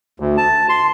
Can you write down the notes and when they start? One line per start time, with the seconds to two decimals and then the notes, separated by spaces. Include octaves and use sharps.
0.20 D2
0.37 A5
0.69 C6